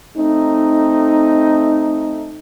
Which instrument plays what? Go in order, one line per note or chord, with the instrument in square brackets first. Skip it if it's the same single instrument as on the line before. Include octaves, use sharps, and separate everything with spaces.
[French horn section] A3 C4 D#4